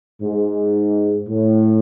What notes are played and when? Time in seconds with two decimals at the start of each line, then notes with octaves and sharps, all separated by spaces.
0.21 G#2
1.28 A2